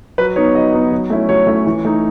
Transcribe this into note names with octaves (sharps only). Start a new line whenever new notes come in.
F#3 B4
B3 D#4 C#5
F#3 D#5
B3 D#4
F#3
A3 C#4 E4
F#3 C#5
A3 C#4 E4
E3
A3 D#4